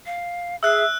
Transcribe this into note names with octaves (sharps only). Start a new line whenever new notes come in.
F5
G#4 E5 E6 F#6